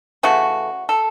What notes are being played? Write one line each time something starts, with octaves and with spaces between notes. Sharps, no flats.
C#3 E3 A3 F#4
A4